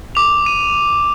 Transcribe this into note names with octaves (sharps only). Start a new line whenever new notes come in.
D6 F7
D#7